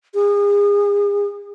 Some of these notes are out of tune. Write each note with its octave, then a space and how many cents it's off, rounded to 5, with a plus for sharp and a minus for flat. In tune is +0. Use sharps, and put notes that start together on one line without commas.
G#4 -35